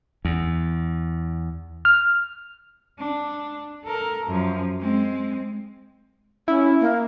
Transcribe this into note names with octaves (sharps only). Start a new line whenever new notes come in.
E2
F6
D4
A4 A#4
F#2 F3
G#3 C4
C#4 E4
A#3